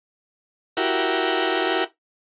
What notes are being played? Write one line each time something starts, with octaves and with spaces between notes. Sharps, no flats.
E4 F#4 G4 A#4